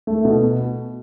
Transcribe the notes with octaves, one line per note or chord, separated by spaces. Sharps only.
A3
B2